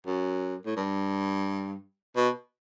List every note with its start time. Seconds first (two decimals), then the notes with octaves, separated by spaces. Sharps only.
0.06 F#2
0.66 A2
0.76 G2
2.16 B2